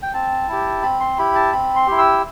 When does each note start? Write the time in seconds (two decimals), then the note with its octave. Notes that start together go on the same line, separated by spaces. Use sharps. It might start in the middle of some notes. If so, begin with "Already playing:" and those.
0.02 G5
0.13 C4 A5
0.48 E4 G4
0.83 C4 B5
1.00 C6
1.18 E4 G4 B5
1.35 A5
1.52 C4 B5
1.76 C6
1.87 E4 G4
1.98 E6